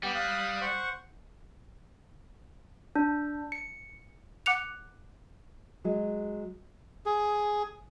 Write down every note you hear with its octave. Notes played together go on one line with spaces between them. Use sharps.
G3 B3 G5 D6
F5 D#6 F#6
C5 F#5 C#6
D4
C#7
F#5 D6 F#6 C#7 F7
F#3 G#3
G#4